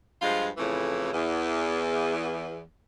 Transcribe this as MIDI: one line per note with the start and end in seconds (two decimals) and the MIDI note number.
0.22 0.49 43
0.22 0.49 53
0.22 0.49 56
0.22 0.49 65
0.58 1.13 41
0.58 1.13 45
0.58 1.13 49
0.58 1.13 52
1.13 2.62 40